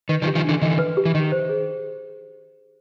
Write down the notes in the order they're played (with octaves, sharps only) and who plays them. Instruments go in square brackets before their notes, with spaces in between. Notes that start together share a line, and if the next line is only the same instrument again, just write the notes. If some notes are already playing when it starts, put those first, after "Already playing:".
[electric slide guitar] D#3 [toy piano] B4
[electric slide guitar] D#3 F3
[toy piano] G4
[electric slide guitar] D#3 F3
[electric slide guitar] D3 E3 [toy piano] D4
[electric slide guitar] D3 E3 [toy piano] D#5
[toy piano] B4
G4
[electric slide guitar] E3
[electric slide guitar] D#3 [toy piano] D#5
[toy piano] C5
G#4